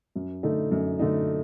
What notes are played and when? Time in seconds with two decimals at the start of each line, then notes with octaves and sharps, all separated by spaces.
0.16 F#2
0.43 D3 A3 D#4
0.71 F#2
0.99 D3 A3 D#4